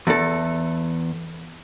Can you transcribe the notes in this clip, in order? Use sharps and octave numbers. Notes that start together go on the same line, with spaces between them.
E2 A4